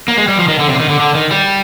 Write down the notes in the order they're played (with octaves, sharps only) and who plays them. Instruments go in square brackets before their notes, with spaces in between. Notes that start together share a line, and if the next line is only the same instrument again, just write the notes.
[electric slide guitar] A#3
G#3
G3
F3
D#3
D3
C3
D3
D#3
D3
D3
D#3
G3